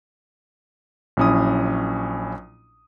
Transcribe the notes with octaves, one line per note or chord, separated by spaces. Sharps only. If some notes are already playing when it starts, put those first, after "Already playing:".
A#1 F#3 C#4 E4 D#6